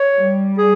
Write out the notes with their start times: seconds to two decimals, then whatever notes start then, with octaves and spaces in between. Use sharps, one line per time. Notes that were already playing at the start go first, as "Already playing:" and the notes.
Already playing: C#5
0.16 G3
0.58 G#4